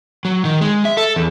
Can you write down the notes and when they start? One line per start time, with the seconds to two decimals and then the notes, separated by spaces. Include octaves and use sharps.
0.25 F#3
0.45 D#3
0.61 G#3
0.85 E5
0.97 A4
1.16 E2